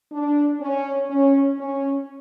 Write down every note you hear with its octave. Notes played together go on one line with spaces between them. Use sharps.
D4
C#4
C#4
C#4